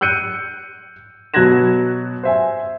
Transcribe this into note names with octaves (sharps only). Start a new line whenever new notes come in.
E6 F#6 G6 C#7 D#7
B2 F#3 F#6 G#6 A#6 E7
C5 E5 G#5